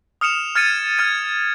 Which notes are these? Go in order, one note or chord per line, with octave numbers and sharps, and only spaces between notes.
D#6 F6 C#7 E7 F7
F6 G#6 A6 C#7 D#7
F6 G#6 D#7